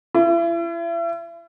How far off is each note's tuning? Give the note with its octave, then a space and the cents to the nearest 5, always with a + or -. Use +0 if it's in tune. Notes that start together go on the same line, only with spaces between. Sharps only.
E4 +40